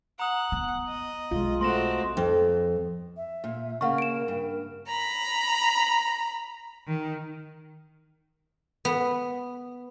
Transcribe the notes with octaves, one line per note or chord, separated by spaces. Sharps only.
F#5 A#5 D#6 F#7
B3
D#5
B1 G#3 F4
A3 C4 F#4 C6 A#6 E7
F2
E5
A#2
C#3 A#3 A#4 F5 F#5 C#6
D7 E7
G2
A#5 B5
D#3
B3